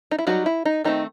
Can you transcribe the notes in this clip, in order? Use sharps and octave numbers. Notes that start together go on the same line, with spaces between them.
D#4
E4
F#3 G3 B3 D#4 F#4
E4
D#4
D#3 A3 C4 D#4